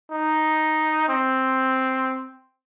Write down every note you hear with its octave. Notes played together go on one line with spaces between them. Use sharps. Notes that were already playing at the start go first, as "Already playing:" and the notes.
D#4
C4